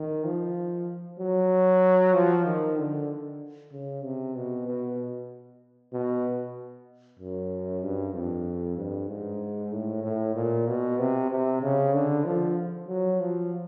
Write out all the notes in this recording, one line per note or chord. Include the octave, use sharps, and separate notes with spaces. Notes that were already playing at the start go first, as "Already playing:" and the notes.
Already playing: D#3
F3
F#3
F3
D#3
D3
C#3
C3
B2
B2
B2
F#2
G2
F2
G2
G#2
A2
A2
A#2
B2
C3
C3
C#3
D3
F3
F#3
F3